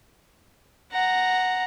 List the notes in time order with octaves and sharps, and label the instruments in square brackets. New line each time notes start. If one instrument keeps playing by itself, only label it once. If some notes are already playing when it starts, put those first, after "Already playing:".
[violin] F#5 A#5